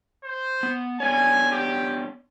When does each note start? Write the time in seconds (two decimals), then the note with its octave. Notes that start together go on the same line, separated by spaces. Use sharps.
0.24 C5
0.63 B3
1.00 B3 D4 C#5 G#5
1.52 G4